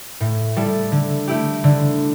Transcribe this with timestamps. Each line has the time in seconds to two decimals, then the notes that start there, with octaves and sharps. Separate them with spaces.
0.20 A2
0.56 G3 E4 A4
0.92 D3
1.28 A3 E4 G4
1.64 D3